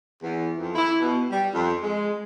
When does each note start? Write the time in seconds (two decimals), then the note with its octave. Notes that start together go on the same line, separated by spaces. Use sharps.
0.23 E2
0.59 F2
0.75 E4
1.01 B2
1.30 G3
1.54 F2
1.82 G#3